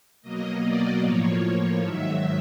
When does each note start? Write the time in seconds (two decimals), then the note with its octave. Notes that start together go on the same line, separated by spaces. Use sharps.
0.22 B2 F#3 A#3 D#5
0.61 D5
1.01 A2 F3 A#3 C#5
1.41 C#5
1.80 G#2 D#3 F#3 E5